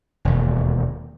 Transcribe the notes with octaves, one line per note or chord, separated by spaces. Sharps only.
E1 D#2